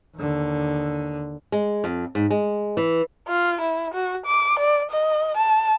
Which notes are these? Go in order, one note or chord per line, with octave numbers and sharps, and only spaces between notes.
D#2 D3
G#3
F2
G#2
G#3
E3
F4
E4
F#4
D6
D5
D#5
A5